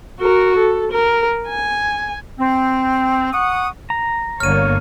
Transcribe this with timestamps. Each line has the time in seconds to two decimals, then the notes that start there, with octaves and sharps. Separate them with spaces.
0.21 F#4 A#4
0.57 A4
0.92 A#4
1.47 G#5
2.39 C4
3.33 F#5 C#6 D#6
3.90 A#5
4.40 G1 D3 A#3 C#5 F6 D#7